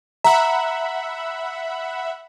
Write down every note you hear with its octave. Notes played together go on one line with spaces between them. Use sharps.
E5 F#5 A#5 B5